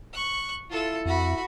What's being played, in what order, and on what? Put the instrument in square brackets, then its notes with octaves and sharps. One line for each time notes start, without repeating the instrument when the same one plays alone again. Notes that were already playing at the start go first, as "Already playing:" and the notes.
[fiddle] C#6 F#6
[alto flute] E4 [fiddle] F4 A4
[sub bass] F2 [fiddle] F#4 B5